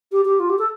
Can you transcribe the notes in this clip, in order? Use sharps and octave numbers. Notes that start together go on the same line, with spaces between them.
G4
G4
F4
G4
A4